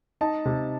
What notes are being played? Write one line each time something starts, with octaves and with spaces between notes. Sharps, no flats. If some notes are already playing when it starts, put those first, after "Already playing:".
D#4 A5
C3